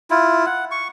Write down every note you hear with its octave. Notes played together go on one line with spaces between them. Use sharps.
E4 F4
F#5
C#6